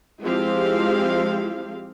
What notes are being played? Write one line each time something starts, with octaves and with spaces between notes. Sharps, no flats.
F3 G#3 C4 E4 G4 F5